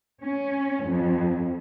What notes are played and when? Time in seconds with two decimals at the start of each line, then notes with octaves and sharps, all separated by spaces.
0.23 C#4
0.85 F2